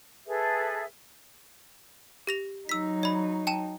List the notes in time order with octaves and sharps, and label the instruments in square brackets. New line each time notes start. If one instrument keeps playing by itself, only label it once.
[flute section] G#4 A4 B4 E5
[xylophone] G4 A#6 F7
[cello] F#3 D#4 [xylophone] E6 B6
[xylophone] D5 B5
G5 A5 E7